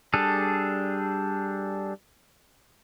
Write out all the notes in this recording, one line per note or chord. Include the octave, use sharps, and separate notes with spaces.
G3 D4 G#4 A4